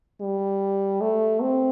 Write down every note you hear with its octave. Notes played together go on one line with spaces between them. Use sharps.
G3
A3
C4